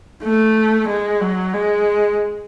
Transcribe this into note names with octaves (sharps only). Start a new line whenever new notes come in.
A3
G#3
F#3
G#3